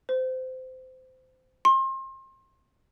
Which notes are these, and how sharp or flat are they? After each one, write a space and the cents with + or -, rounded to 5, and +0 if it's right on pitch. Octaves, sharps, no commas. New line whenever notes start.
C5 -25
C6 +35